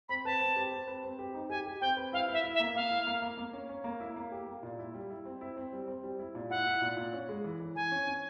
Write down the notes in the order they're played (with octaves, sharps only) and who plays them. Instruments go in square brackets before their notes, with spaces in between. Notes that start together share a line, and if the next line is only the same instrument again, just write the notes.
[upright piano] C4 [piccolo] B5
[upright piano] B4 [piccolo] A5
[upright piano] C4
G4
C4
B4
C4
G4
D#4
[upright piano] G4 [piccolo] G#5
[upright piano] G4
[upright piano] C4 [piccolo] G5
[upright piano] B4
[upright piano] E4 [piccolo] F5
[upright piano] E4 [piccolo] E5
[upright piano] E4
[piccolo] E5
[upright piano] A#3
[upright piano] A#3 [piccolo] F5
[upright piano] E4
A#3
A#3
A#3
C#4
C#4
A#3
E4
A#3
G4
A#3
A#2
E4
G3
E4
C4
E4
C4
G3
C4
G3
E4
A#2
[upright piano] E4 [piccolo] F#5
[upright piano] E4
A#2
A#2
C#4
G#3
E3
E3
[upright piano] E3 [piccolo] G#5
[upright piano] C#4
C#4